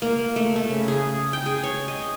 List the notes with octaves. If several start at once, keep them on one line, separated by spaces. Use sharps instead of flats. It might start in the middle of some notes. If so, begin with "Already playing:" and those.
A#3
A3
A3
C#3
G#4
G5
G#4
C#5
D#5